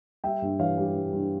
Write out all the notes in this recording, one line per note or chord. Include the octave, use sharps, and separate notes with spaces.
G3 E5 G5
G2
E3 C#5 F5
G3
G3
G2